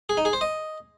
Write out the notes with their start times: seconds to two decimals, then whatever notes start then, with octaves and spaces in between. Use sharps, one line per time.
0.09 G#4
0.17 D#4
0.25 G#4
0.33 C5
0.41 D#5